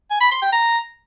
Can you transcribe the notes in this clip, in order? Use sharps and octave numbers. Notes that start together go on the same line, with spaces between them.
G#5
B5
C6
G5
A#5